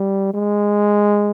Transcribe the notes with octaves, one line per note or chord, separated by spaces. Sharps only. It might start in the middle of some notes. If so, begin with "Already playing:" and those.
Already playing: G3
G#3